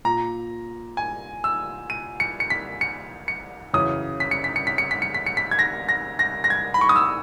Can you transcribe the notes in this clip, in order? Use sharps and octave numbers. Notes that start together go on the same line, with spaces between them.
A#2 A#5
G#5
E6
D#7
C#7
C#7
B6
C#7
C#7
F#2 C#3 E3 D#6
B6
C#7
B6
C#7
B6
C#7
B6
C#7
B6
C#7
B6
G#6
A#6
A#6
A#6
A#6
G#6
B5
C#6
D#6
E6